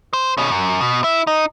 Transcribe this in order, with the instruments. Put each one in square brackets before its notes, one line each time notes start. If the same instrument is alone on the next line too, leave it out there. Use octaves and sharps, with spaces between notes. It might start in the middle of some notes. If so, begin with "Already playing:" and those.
[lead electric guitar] C5
B2 C#4
F#2
B2
E4
D#4